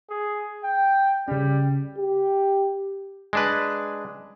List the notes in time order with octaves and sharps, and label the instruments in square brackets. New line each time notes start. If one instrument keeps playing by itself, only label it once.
[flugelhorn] G#4
G5
[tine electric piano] C#3 C#4 [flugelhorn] G3
[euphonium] G4
[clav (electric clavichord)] G#3 D4 B4